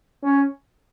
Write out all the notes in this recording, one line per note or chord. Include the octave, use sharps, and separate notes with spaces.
C#4